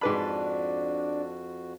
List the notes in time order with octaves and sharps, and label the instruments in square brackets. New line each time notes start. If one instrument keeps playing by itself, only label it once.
[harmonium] F2 F#4 [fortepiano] G#2 B4 B5 [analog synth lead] D4